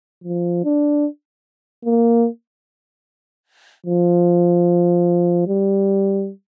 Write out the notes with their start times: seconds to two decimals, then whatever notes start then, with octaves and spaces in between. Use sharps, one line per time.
0.24 F3
0.64 D4
1.85 A#3
3.86 F3
5.47 G3